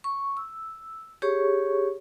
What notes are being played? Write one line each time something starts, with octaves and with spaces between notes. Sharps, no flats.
C#6
E6
G4 G#4 C#5 C#6